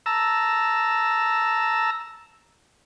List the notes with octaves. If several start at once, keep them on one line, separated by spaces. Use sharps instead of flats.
A5 A#5 E6